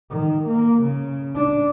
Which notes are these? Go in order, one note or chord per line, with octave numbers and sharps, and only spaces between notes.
D#3
A#3
C#3
D4